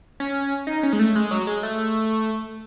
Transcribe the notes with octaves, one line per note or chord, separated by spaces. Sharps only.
C#4
D#4
C#4
G#3
A3
G#3
F#3
G#3
A3